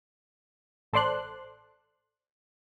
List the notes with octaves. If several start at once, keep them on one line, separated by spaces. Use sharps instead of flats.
A1 A4 C5 D5 C6 F#6